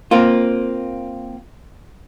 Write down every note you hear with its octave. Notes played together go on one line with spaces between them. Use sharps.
A#3 C4 F4